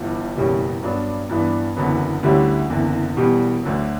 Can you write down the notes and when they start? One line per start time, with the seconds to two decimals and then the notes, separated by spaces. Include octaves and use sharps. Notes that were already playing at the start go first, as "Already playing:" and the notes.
Already playing: G1 G2 E3
0.35 F#1 E2 B2 G3 C#4
0.82 G2 F#3 B3 D4
1.29 G2 E3 B3 D4
1.76 F#1 E2 D3 F#3 B3
2.23 D2 D3 G3 C#4 E4
2.70 F#1 E2 D3
3.16 E1 E2 B2 G3
3.63 D2 D3 F#3